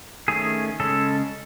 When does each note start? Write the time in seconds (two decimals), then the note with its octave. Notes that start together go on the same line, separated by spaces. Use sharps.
0.28 D#3 A3 C#4 G#4
0.80 C#3 G#3 C#4 A4